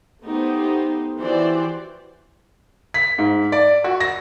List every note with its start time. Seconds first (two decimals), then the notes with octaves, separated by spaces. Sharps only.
0.23 A3 B3 D#4 G4 C5
1.20 E3 F#4 G4 C5 D5
2.94 B6
3.18 G#2
3.52 D5
3.84 F#4
4.00 A#6